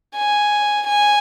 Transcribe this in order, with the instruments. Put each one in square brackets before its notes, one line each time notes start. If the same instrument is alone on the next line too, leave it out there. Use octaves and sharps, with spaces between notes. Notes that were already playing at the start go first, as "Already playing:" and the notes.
[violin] G#5
G#5